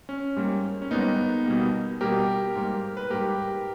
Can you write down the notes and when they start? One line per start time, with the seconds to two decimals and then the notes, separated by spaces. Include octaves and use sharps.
0.09 C#4
0.36 G#2 G3 A#3
0.82 C#4
0.91 G#2 G3 A#3 B3 D#4
1.46 B2 G3 A#3
2.01 B2 G3 A#3 G4 A#4
2.55 G#2 G3 A#3
2.97 B4
3.10 G#2 G3 A#3 G4 A#4